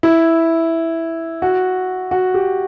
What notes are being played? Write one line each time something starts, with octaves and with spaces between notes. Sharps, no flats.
E4
F#4
F#4
G4